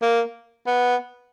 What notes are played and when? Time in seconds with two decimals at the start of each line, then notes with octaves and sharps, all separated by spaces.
0.02 A#3
0.67 B3